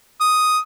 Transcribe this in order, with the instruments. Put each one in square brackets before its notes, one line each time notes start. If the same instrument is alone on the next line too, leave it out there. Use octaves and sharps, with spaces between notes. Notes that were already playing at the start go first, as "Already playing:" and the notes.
[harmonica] D#6